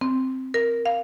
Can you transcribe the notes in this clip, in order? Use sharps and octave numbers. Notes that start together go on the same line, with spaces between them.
C4
A#4
F5